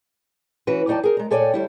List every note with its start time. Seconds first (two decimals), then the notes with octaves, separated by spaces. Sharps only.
0.67 E3 C#4 F#4 B4
0.87 E2 F#3 D#4 D5 G5 A5
1.03 G#4 A#4
1.17 G#3 A#5
1.31 A#2 A4 C#5 D5 G5 G#5
1.54 D2 G3 E4